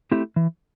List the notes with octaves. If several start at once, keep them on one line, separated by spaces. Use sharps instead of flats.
A3 C4 E4 G4
E3